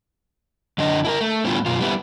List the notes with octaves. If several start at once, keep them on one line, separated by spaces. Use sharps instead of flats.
F#2 D3 D4 D#5
E4 A4 A#4
A3
A2 D3 G3 B3 E4 F4
F#2 B2 F4
G3 B3 E4